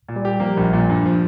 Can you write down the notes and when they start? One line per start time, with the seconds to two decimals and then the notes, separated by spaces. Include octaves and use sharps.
0.09 A#2
0.16 G3
0.25 G4
0.40 F3 A#3
0.57 A#1
0.73 A#2
0.89 G2
1.06 F3